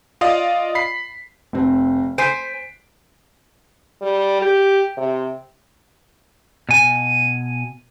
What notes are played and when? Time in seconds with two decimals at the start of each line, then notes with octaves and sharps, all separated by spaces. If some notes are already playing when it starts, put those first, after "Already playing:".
0.21 F4 D5 D#5 F5 D#6
0.75 B5 B6 C7
1.53 F1 C4
2.18 C5 G#5 B6 C7 D7
4.01 G3
4.42 G4
4.97 C3
6.69 B2 G#5